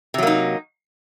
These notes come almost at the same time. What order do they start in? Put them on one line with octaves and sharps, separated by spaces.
C3 F#3 A#3 D#4